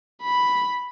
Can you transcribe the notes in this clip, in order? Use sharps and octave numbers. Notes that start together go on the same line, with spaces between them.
B5